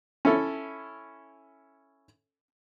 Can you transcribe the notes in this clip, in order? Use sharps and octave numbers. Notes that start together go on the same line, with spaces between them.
C#4 E4 A4